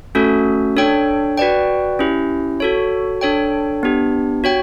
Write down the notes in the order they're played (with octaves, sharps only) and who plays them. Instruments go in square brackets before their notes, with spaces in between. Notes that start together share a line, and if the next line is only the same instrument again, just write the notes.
[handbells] A3 C#4 F#4 A4
D4 A4 C#5 G5
F#4 B4 D5 G5
C#4 E4 G4
F#4 A4 C#5
D4 A4 C#5 G5
B3 D4 G4
F#4 C#5 G5